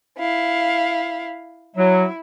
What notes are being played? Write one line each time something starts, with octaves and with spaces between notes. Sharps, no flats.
E4 F5
F#3 E4